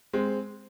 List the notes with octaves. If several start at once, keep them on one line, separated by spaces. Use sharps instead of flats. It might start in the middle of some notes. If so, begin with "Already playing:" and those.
G#3 C4